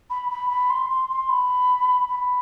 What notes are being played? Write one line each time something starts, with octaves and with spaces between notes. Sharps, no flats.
B5
B5
B5
C6
C6
C6
B5
B5